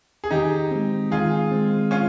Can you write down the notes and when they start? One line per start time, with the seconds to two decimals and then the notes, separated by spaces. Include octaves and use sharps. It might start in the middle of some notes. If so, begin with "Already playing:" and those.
0.24 G#4
0.31 D#3 D#4 G4
0.71 G#3 C4
1.11 D#3 F4 G#4
1.51 G#3 C4
1.91 C#4 F4